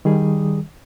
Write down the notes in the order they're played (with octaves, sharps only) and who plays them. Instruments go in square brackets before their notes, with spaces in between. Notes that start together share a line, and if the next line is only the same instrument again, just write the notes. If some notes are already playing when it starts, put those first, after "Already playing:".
[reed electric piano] D#3 G3 G#4